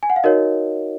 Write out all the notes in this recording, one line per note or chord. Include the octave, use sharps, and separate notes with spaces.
G#5
F#5
F5
D#4 F#4 A#4 C#5 D#5